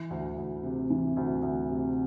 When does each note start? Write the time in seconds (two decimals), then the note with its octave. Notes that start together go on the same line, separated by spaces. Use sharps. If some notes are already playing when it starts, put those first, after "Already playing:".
Already playing: E3
0.10 D2
0.37 D2
0.63 C3
0.90 E3
1.17 D2
1.42 D2
1.69 C3